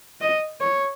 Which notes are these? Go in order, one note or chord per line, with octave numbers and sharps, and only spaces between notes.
D#5
C#5